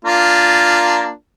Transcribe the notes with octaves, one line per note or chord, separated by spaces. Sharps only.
A#3 D4 F4